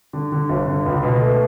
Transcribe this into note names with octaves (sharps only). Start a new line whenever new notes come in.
D3
D3
G1
D3
C#2
B2
A3